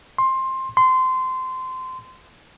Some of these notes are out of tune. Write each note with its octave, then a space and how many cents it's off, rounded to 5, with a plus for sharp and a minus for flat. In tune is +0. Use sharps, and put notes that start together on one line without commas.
C6 +15
C6 -20